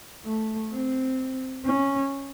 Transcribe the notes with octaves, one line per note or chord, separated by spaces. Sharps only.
A3
C4
C#4